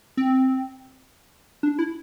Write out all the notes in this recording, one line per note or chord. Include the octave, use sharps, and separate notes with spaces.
C4
D4
E4